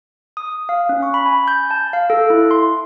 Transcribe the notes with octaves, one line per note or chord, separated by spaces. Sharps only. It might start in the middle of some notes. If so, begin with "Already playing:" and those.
D#6
F5
C#4
C#6
B5
G#5
G6
A5
F5
A4
E4
C6